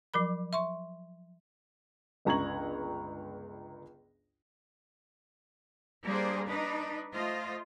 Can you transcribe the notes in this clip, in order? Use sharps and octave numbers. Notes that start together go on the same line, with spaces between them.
F3 F#3 A#4 B5
E5 C6 C#6
G1 C#2 A#5 C#6 G#6 F#7
G3 A#3 D4 G#4 C5
D4 D#4 B4
A3 F4 C5 D#5